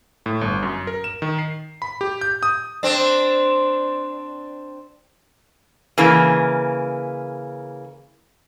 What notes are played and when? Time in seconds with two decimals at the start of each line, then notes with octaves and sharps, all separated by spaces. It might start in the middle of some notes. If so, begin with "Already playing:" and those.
0.26 A2
0.41 G1
0.63 F#2
0.87 A#4
1.04 E7
1.22 D#3
1.39 C7
1.82 B5
2.01 G4
2.21 G6
2.43 D#6
2.83 C4 D4
5.98 C#3 E3 A#3